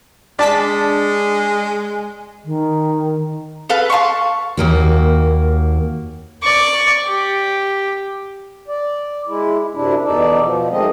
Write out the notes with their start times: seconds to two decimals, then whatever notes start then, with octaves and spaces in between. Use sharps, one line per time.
0.39 G#3 D4 D5 A5 B6
2.45 D#3
3.69 A4 B4 F5
3.90 F5 A5 C6 C#6
4.57 D#2 A#3 F#4
6.43 D5 C#6
7.06 G4
8.68 D5
9.27 G#3 E4
9.74 F#2 C3 D4 E4
10.04 E2 B2 D#4 A4 D5
10.41 B2 F3
10.70 F#2 D#3 G#3 A3 C4 D#5